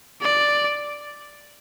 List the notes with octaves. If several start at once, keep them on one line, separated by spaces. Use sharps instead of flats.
D5